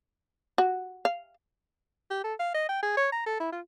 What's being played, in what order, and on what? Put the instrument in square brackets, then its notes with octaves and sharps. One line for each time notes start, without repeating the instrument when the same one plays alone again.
[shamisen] F#4
F5
[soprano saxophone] G4
A4
F5
D#5
G5
G#4
C#5
A#5
A4
E4
F4